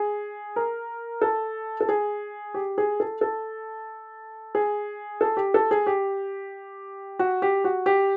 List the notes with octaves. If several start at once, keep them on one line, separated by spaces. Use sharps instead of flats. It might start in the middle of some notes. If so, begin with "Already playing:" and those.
Already playing: G#4
A#4
A4
A4
G#4
G4
G#4
A4
A4
G#4
A4
G4
A4
G#4
G4
F#4
G4
F#4
G4